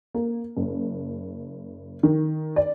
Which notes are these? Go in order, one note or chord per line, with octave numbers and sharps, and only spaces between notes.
A#3
F#1
D#3
D5